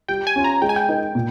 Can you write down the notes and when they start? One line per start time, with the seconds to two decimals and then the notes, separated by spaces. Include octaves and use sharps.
0.09 G3 G5
0.27 G#5
0.36 C#4 F4
0.44 A#5
0.62 G#3 G5
0.69 G#5
0.76 G5
0.89 D#4 A#4
1.15 A#2